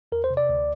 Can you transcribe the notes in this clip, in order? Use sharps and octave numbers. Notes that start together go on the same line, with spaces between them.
E2 A#4
C5
C3
D5
D2